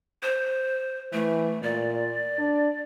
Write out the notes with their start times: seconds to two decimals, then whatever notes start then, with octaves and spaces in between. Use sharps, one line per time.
0.23 C5
1.13 E3 A3
1.63 A#2 D5
2.38 D4